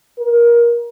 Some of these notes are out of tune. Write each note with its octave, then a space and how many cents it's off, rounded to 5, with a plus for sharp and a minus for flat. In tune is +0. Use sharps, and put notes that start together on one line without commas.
A#4 +20